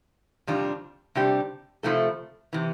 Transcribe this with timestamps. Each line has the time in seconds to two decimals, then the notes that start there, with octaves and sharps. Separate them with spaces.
0.47 F2 C3 G3 D4 F4
1.15 C3 G3 D4 G4
1.83 C3 F3 A3 E4 A4
2.53 C3 E3